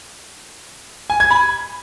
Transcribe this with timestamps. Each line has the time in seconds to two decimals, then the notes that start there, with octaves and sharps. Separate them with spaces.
1.10 G#5
1.20 G#6
1.31 B5